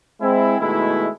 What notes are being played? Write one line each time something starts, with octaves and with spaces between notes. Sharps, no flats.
G#3 C4 E4
B2 D#3 G#3 A3 E4